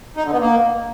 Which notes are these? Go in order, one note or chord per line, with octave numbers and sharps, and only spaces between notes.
D#4
D3
B3
A#3